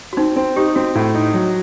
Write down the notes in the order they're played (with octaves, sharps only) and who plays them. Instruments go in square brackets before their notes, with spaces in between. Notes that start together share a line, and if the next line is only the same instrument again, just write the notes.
[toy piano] F#4
[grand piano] C4 [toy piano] D#4
[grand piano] C4
[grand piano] D#4 [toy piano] G4
[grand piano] C4 [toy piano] F#4
[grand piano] A2
D#4
F#3